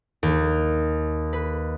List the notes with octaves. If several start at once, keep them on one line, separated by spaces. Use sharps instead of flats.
D#2
B4